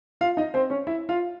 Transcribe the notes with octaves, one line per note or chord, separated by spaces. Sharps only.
F4 F5
D#4 D#5
C4 C5
C#4 C#5
E4 E5
F4 F5